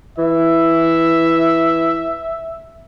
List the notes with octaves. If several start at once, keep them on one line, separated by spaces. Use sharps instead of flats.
E3 E5